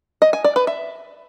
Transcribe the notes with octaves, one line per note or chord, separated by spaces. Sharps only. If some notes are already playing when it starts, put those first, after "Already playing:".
D#5
G#5
D5
B4
E5